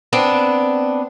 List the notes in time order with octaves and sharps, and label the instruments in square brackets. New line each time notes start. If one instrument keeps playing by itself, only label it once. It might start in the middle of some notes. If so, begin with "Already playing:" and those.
[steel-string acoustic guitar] B3 C4 D4